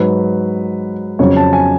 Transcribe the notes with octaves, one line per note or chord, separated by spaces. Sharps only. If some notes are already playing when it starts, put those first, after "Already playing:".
Already playing: G#2 F#3 B4
F2 C#3 F#3 C#5
A5
G#5